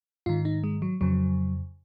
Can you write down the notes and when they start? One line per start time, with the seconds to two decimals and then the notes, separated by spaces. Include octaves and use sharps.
0.26 G#2 D#3 F4
0.45 D#4
0.64 G#3
0.82 F#3
1.01 F2 C#3 F#3